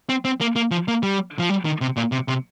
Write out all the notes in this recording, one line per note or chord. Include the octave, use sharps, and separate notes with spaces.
C4
C4
A#3
A#3
F3
A#3
G3
F3
G3
D#3
C3
A#2
C3
C3